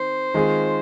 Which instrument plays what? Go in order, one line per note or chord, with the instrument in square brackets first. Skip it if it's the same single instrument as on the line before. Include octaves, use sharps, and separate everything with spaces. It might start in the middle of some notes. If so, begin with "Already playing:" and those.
Already playing: [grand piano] D#3 C4 [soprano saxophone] C5
[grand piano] D#3 G#3 C4 F4 G#4